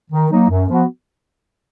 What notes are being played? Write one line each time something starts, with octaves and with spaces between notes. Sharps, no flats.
D#3
F#3 A#3 D#4
F#2
F3 B3 F#4